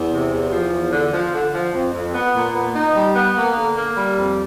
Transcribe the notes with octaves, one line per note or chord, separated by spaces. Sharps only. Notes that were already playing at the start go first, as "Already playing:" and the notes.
Already playing: E2
C3
E2
F3
E2
D3
F3
D3
F3
F2
F2
B3
A#2
B3
D#4
G3
B3
A#3
D3
A#3
G3
F2